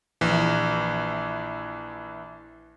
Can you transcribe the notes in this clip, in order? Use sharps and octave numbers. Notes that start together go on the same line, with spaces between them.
A#1 E3